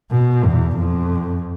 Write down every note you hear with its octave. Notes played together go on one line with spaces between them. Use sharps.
B2
E2
F2